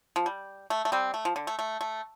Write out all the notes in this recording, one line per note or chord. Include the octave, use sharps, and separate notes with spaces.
F3
G3
A3
A3
G3 C4
A3
F3
D3
A3
A3
A3